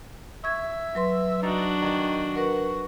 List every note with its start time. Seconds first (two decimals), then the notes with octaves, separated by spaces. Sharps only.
0.44 E5 C#6 G#6
0.95 F#3 B4 C6
1.43 D4 D#4 F#4 A6
1.82 D#3
2.36 F#4 A#4 B4